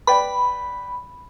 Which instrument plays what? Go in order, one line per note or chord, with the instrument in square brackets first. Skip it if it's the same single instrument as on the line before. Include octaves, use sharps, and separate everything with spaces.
[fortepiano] B4 D5 G5 [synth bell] B5